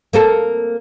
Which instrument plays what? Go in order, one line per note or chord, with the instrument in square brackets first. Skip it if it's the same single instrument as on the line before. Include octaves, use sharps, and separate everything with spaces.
[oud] A#3 C4 A4